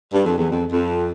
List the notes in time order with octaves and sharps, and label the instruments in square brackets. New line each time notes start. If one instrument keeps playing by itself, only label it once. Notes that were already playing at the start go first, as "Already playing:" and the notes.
[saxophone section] G2
F2
E2
F2
F2